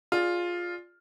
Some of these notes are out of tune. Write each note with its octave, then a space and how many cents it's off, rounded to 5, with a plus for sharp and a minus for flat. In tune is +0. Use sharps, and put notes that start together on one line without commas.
F4 +5 G#4 +0 D5 +0